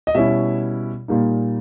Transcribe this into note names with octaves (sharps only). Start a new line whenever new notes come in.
D#5
B2 G3 C#4 E4 E5
A#2 G3 A#3 D#4